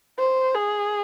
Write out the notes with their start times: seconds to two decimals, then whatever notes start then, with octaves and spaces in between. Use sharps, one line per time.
0.19 C5
0.55 G#4